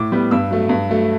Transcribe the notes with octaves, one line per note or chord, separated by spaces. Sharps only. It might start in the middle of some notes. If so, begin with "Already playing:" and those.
Already playing: A2 D6
G3 B3
G2 E6
F#3 A3
G2
F#3 A3